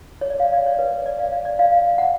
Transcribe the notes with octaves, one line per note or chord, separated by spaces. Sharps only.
C#5
D5
F5
D5
C#5
B4
C#5
D5
F5
D5
D5
F5
F#5